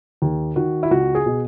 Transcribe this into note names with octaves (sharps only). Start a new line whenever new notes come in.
D#2
D#3 F#4
E4
C#2 F#4
G#4
B2